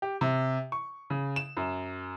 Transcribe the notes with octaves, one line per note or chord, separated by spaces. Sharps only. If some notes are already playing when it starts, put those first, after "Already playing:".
G4
C3
C#6
C#3
E7
F#2